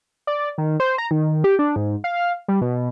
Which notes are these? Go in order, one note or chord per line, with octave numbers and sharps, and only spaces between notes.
D5
D#3
C5
A#5
D#3
G4
D4
G#2
F5
G3
B2